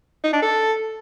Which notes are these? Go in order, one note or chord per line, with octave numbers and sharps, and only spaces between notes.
D#4
D4
A4